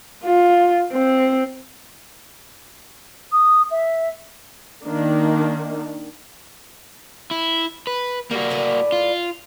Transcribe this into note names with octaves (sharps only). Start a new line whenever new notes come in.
F4
C4
D#6
E5
D#3 A#3 D4
E4
B4
G3 A#3 F#4
A2 B4 D5
F4